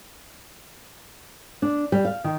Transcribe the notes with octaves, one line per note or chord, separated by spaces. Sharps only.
D4
G3
F5
D#3